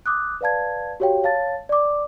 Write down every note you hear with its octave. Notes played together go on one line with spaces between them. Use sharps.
D6 D#6 F#6
B4 D5 F5 A5 G#6
F#4 G4 C#5 F5 G5
C#5 F5 A5 A6
D5 D6